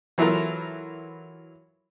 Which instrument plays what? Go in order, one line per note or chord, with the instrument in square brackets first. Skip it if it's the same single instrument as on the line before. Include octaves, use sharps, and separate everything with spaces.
[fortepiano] E3 F#3 E4 F4 A4 A#4